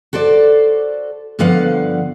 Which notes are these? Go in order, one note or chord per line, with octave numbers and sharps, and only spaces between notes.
F#4 A4 C5 D5
G2 D3 F3 B3 F5 F#5